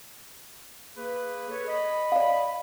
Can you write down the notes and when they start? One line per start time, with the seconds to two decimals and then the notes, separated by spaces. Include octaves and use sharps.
0.97 A#3 G#4 B4
1.49 A4 B4 C#5
1.68 D#5 B5
2.12 D5 F5